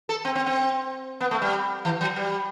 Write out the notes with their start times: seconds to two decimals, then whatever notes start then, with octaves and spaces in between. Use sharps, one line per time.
0.09 A4
0.25 C4
0.35 C4
0.46 C4
1.20 B3
1.31 A3
1.42 G3
1.85 E3
2.01 F#3
2.16 G3